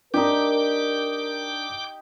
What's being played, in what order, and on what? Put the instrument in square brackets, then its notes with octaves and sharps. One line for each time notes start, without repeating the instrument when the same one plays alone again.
[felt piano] D4 [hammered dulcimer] D#4 G4 [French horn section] A#4 [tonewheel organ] D6 G6